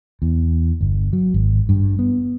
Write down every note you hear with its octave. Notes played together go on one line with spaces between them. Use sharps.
E2
G1
F#3
G#1
G2
B3